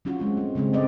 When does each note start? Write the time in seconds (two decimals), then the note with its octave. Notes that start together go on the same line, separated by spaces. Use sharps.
0.05 F#3 C#4 F4 F#4
0.19 G#3 C4
0.37 A3
0.55 C#3 G3 G#3 C4
0.73 A3 C4 D5 D#5